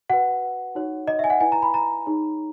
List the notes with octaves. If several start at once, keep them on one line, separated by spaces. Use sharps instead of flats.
F#4 B4 F#5
D#4 F#4 C#5
D#5
E5 G#5
F#5
E4 B4 G#5
A#5
B5
A#5
D#4 G#4 C#5